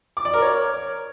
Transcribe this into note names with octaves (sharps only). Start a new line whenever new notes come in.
D6
D5
A#4
C#5